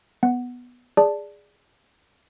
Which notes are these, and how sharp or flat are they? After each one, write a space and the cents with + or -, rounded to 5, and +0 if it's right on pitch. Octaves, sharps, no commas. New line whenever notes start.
B3 +0 F#5 +0
G#4 -10 D5 +0 A5 +0